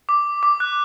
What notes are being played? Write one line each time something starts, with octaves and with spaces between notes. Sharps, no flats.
D6
D6
F#6